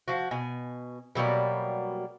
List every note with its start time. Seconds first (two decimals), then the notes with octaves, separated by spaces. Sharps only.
0.08 F3 F#4
0.31 B2 G#5
1.15 B2 F#3 G3 A#3